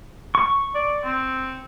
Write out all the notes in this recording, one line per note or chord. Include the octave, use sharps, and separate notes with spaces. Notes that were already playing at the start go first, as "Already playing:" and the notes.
C#6
D5
C4